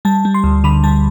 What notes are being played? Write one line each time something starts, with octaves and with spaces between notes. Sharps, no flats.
G3 A5
G3
C6
D2
D3 B5
G3 A5